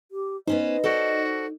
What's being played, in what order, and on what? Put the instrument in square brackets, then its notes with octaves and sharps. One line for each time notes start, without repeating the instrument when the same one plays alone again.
[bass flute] G4
[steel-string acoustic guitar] B3 C#4 C5 [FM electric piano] D#4 [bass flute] D#5
[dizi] F#4 [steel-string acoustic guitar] A4 C5 D5